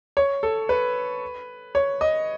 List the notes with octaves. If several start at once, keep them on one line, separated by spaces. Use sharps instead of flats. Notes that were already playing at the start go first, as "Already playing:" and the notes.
C#5
A4
B4
C#5
D#5